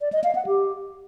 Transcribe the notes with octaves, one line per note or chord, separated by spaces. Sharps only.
D5
D#5
F5
F#5
G4